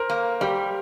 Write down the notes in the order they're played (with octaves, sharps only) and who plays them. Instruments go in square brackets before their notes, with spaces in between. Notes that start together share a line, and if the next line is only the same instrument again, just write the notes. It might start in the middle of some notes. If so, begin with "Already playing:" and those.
Already playing: [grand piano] A#4 C5
[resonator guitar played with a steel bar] A#3
[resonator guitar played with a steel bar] G3 [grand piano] G4